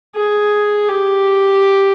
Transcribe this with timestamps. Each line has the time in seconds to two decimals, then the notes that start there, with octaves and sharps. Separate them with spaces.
0.16 G#4
0.88 G4